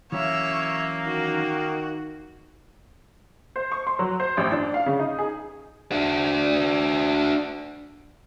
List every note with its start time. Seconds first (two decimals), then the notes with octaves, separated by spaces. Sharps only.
0.12 E3 F#3 A#3 C#4 C#5 E5
1.06 D#3 F#4
3.56 C5
3.72 C#6
3.87 C6
3.99 F#3
4.20 C5
4.37 A1
4.52 D4
4.74 F5
4.86 C#3
5.00 D#4
5.19 G#4
5.91 D4 F#4